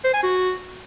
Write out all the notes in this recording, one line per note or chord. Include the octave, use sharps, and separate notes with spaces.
C5
G#5
F#4